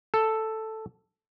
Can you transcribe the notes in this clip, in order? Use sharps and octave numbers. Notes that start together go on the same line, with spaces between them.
A4